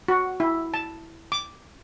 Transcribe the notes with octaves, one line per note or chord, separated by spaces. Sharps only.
F#4
E4
A5
D6